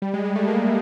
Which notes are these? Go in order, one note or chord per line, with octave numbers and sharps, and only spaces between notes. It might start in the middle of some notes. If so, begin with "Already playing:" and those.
G3
G#3
G#3
A3
A#3